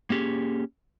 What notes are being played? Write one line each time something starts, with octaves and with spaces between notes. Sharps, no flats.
A#3 C#4 G4 G#4